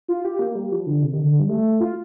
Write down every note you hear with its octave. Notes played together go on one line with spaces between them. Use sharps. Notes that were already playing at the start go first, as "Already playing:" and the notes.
F4
G4
A#3
G3
F3
D3
C3
D#3
D3
G3
A3
F4